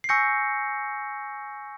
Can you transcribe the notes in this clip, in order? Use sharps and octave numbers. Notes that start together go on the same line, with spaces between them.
C7
G#5 C#6 E6 G6 A#6 C#7